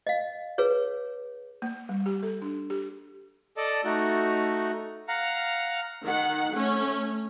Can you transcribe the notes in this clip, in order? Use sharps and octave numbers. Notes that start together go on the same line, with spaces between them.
D#5 F5
G#4 B4 C#5
A#3
G3
G4
A4
D4
G4
A4 D5 D#5 A5
A3 D#4 F#4
F5 F#5 A#5
D#3 F#5
A3 C#4